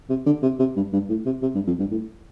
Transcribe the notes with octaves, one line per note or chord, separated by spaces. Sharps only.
C3
D3
C3
C3
G2
G2
A2
C3
C3
G2
F2
G2
A2